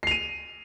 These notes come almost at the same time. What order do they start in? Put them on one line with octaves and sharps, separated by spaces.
C7 F7 D#7